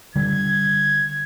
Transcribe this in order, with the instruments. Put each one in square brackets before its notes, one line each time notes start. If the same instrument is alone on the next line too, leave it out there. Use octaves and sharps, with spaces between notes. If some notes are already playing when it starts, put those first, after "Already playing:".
[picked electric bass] D3 G3 [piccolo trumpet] G#6